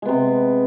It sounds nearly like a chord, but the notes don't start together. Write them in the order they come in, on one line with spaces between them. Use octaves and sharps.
G#3 B3 C3